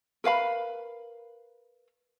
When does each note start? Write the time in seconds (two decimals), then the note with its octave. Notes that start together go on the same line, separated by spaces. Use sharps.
0.24 A#4 B4 F5 B5